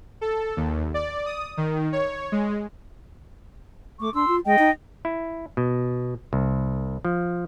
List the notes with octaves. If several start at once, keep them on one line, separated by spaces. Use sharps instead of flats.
A4
D#2
D5
D#6
D#3
C#5
G#3
A3 C#6 D6
D4 C6 E6
F4
G#3 D#5 G5
D#4
E4
B2
C2
F3